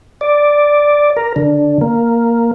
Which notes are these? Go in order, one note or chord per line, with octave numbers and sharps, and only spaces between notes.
D5
A#4
D3
A#3